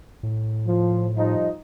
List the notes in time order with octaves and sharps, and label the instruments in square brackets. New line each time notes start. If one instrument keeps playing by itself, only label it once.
[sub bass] A2
[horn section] F3
F3 G3 D#4